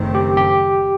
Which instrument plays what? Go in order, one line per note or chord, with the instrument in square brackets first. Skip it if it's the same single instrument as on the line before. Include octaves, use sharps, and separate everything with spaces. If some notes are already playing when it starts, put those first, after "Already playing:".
Already playing: [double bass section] F#1 F#2 D#3 A3 C4
[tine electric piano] G4
G4